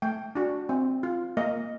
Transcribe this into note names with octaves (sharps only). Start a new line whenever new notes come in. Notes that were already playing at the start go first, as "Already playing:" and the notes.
A3 G5
D4 F#4
C4
F4
A#3 D#5